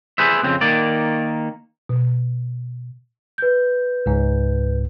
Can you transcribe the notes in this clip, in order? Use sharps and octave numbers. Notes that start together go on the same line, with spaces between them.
G#4 B4 C5 E5
F2 C#3 C4
D#3 A#3 D5
B2
B4 G6
C#2 G#2